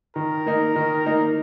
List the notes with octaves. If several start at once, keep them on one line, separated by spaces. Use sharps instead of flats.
D#3 A#4
A#3 D#4
D#3
A#3 D#4